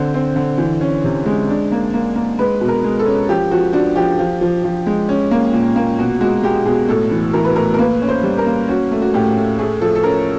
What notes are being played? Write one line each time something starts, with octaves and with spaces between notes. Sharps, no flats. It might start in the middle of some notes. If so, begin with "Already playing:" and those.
Already playing: D3 C4 C5
C4
D3
E3
C#4
C3
G#3
D4
A#3
A#3
A#3
G#3 B4
B2
A#4
G#3
A4
C#4
F3 G4
F3 F#4
D4 F#4
F3 G4
F3
F3
F3
G#3
C#4
A#3
A#2
A#3
B2 F#4
G#3 F#4
G#3 G4
B2 G#4
A2 A4
E3
E3 A#4
B4
A2 A#4
A#4
A#3 B4
C#4
C5
G3
A#4
A#3
C#4 F#4
A3
F#4
A2 G4
A3
A3 G#4
F3 A4
A4
C#4 A#4